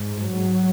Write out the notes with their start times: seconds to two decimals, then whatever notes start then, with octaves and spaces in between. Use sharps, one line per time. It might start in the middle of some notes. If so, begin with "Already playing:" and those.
Already playing: G#2
0.16 F#3